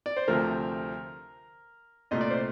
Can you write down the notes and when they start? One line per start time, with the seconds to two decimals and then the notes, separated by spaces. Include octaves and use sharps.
0.06 D5
0.17 C5
0.28 D2 C3 F3 A3 A#4
2.11 C2 A#2 A3 D#5
2.21 D5
2.30 C5